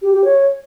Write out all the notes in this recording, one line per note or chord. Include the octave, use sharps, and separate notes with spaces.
G4
G4
C#5